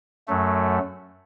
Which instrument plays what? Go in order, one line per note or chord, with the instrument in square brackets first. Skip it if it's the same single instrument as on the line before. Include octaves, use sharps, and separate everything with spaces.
[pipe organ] F#2 F#3 A3